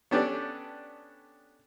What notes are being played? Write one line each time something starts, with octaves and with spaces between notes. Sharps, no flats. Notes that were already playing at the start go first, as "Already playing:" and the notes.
B3 C#4 D4 G4 A4 D5